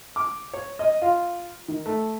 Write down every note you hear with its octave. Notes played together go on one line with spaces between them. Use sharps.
D6
C#5
D#5
F4
D#3
A3